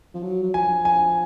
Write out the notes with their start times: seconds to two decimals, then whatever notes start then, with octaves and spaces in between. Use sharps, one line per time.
0.15 F3
0.23 F#3
0.43 F#3
0.54 F3 G#5
0.85 G#5